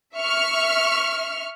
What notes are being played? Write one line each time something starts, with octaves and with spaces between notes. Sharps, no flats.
E5 C#6 F6